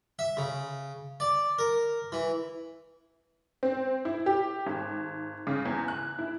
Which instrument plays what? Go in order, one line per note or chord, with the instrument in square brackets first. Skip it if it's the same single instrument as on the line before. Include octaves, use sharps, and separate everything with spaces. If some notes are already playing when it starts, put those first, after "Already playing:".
[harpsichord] E5
C#3
D5
A#4
E3
[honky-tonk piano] C4
E4
G4
G#1
C#3
E2
F#6
E4